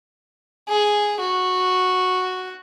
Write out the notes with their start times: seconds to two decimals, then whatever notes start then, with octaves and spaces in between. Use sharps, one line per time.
0.69 G#4
1.20 F#4